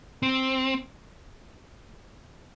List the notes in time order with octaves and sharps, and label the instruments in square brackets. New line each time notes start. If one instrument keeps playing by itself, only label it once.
[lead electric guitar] C4